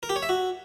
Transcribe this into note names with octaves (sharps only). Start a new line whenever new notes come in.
A#4
G4
C#5
E5
F#4